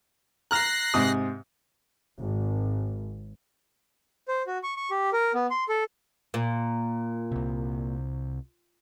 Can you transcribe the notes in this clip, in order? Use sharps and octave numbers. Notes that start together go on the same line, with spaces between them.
A#5 F6 F#6 A#6 C7
G#2 C3 D#6
G#1
C5
F#4
C#6
C#6
G4
A#4
B3
C6
A4
A#2
C2 C3